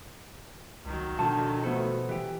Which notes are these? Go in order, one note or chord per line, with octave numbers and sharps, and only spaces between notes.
C#2 D#3 F#3
B2 D3 F3 F#4 A5
F3 A3 B3 F#4 A4
E3 G4